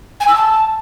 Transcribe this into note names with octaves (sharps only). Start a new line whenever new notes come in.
G#5
E6
A5